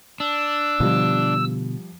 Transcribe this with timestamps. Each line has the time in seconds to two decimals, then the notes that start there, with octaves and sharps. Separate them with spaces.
0.20 D4 E6
0.80 B2 D3 F3 G3 B3